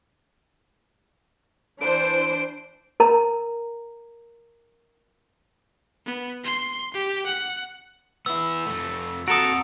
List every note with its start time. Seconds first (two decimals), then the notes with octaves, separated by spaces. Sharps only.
1.81 E3 D4 C5 D7
3.00 A#4 A#5
6.06 B3
6.44 C6
6.94 G4
7.26 F#5
8.26 B3 E4 E6
8.67 F2 A3
9.28 F2 F#4 A4 A#5 D#6 D7